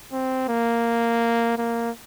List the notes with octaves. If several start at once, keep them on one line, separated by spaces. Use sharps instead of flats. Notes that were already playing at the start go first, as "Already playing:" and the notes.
C4
A#3
A#3